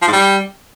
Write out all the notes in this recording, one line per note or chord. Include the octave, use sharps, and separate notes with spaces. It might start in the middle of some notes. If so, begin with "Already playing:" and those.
F3
G#2
G3